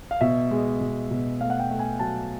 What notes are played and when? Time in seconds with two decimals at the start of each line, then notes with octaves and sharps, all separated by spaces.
0.11 F5
0.21 B2 E5
0.51 G#3
0.81 B2
1.11 B2
1.41 A3 F5
1.50 F#5
1.60 G5
1.70 A3
1.79 G#5
1.99 F#3 A5